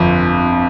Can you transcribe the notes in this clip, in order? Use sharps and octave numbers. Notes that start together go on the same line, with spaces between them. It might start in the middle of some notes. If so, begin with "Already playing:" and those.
Already playing: G1 F2